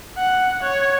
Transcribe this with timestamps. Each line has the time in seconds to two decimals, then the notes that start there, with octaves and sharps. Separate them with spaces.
0.17 F#5
0.62 C#5